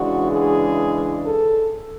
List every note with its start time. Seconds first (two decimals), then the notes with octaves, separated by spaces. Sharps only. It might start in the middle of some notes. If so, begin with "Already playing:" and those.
Already playing: C#3 E3 G#3 D4 F#4
0.31 G#4
1.24 A4